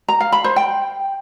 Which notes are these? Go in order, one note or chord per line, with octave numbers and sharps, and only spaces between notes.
A#5
F5
B5
C5
G5